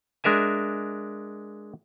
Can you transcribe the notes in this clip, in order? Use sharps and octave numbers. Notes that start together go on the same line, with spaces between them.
G#3 D4 A#4 E5 G#5